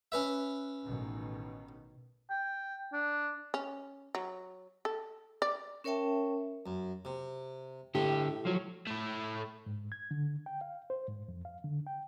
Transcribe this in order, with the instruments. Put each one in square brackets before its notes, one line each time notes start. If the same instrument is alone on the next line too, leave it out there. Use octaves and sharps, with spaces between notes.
[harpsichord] C#4 B4 E5
[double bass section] A1 B2 D#3
[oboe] G5
D4
[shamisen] C#4
F#3
A4
D5
[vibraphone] C#4 A#4 C#5 E5 G5 A5
[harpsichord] F#2
C3
[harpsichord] A2 [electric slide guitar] D3 G4
[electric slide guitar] F3 F#3
[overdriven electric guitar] A3 E4
[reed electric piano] G#2
G#6
D3
G5
F5
C5
G#2
F2
F5
D3
G5